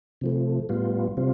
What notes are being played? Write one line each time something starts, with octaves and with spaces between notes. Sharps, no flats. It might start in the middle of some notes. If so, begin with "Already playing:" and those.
C3 F3 A3
A2 G3 B3 F4
C3 G3 C4 F4